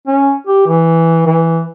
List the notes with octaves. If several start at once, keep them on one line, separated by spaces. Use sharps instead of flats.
C#4
G4
E3
E3